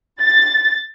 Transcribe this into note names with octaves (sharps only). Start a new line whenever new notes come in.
A6